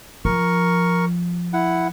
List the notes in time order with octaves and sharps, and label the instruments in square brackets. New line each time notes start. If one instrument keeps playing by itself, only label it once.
[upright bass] F3 [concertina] A#4 C#6
[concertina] E4 F#5